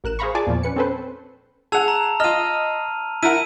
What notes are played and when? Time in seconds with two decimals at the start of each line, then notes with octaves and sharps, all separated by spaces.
0.04 A1 A#4 F#6 E7
0.19 G#4 C5 F5 A#5 B5 C#6
0.35 F4 G#4 D5 G#5 A5 D6
0.47 E2 A#2 F3
0.63 C#4 B4 C#7
0.76 C4 C#4 A4 B4 C5
1.72 G#4 F#5 A5 E6 F7
1.88 A#5
2.20 F4 D#5 F6 D#7
3.23 E4 A#4 F#5 D#7